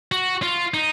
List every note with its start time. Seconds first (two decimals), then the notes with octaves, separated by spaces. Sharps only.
0.12 F#4
0.42 F4
0.74 D#4